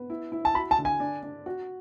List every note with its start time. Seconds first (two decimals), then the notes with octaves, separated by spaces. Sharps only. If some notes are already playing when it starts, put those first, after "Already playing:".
Already playing: B3
0.10 E4
0.32 E4
0.45 A5
0.55 F#4 B5
0.71 A5
0.78 D3
0.85 G#5
1.00 D4
1.23 D4
1.46 F#4